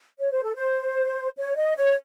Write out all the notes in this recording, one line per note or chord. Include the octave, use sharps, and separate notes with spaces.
C#5
C5
A4
C5
C#5
D#5
C#5